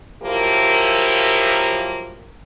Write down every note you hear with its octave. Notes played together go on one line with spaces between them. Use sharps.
F3 F#3 A#3 E4 G4 A#4